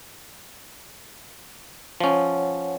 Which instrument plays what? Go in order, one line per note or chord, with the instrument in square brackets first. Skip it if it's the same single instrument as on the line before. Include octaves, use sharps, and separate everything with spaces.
[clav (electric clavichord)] F3 C#4 [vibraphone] C#5 F#5